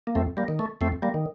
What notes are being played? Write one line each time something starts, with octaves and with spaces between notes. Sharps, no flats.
A#3
F2 A3 C4
G3 A#3
D#3
A3
F2 A3 C4
G3 A#3
D#3